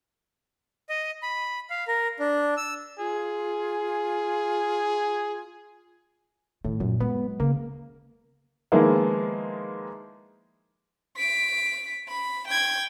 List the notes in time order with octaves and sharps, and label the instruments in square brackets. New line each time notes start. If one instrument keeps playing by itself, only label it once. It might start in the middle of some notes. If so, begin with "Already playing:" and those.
[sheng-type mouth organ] D#5
B5
F5
A#4
D4
E6
[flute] F4 [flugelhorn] G#4
[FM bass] A2 [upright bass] D#3
[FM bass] F#2 [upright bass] A#2
[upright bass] F#3 G#3 [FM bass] B3
[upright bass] C#3 [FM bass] A#3
[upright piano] D#3 F3 G#3 A#3 B3 E4
[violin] B6 D7
B5
G5 G#6